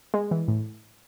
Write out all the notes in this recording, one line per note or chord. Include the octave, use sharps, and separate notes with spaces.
G#3
E3
A2